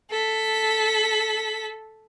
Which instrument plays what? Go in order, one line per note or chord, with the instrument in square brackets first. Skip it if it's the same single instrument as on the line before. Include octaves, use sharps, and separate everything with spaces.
[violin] A4 B6